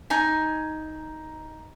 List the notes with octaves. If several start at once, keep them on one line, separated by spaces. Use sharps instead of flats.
D#4 G#5